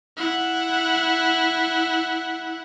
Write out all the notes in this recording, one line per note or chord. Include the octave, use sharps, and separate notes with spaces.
E4 F#5